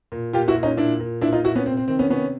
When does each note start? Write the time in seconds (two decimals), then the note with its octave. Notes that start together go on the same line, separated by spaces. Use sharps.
0.12 A#2
0.33 A#2 F4 G4
0.48 E4 F#4
0.55 A#2
0.63 C#4 D#4
0.77 A#2 D4 E4
1.00 A#2
1.21 A#2 D4 E4
1.33 D#4 F4
1.44 A#2 E4 F#4
1.56 B3 C#4
1.66 C3 C4
1.77 C4
1.88 D#3 C4
1.99 B3 C#4
2.10 C3 B3 C#4